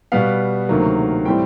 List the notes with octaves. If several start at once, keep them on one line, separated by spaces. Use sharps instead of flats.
B2 G3 B3 F5
D2 C3 D#3 F#3 A#3
A2 E3 G3 C4 G5